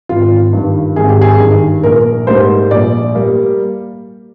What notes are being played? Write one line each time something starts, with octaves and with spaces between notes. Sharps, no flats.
G#1 F4
G2 D#3
G#1 G#4
G4
G#4
G2 D#3
A#1 A#4
G#2 G3 A#3 C5
A#1 D5
G3 A#3